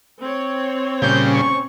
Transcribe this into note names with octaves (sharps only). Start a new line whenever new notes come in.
C4 C#5
A#2 C#3 G3 C#4 G6
C#6